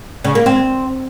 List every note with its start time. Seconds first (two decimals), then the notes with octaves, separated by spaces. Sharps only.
0.24 C#3
0.35 A#3
0.46 C4